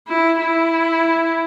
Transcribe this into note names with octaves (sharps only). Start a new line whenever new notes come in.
E4
E4